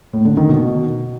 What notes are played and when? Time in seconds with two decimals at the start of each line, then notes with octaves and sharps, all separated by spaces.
0.13 A2
0.25 D3
0.37 D#3
0.49 B2